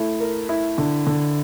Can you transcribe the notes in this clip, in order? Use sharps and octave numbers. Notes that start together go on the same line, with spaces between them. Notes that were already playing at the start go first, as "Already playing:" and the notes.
Already playing: A3 E4
A#4
E4
D3
D3